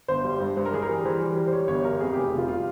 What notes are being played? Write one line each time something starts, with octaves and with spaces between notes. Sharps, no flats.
G1 C5
G3
G2
G2 C5
A#4
E3 G#4
A#4
G3
E3 C5
G3
G3
C5
G3 C#5
G1 C#5
G3 A#4
F2 G#4
F1 G4
F1 F4
G3 F4